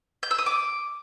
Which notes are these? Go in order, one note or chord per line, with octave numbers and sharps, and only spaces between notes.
G6
E6
D#6
D6